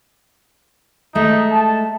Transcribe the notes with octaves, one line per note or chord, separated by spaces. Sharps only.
G#3 A3 D#4
A5